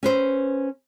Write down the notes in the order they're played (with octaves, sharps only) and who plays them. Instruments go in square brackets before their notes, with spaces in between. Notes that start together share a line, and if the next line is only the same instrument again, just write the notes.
[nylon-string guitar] C#4 B4 C5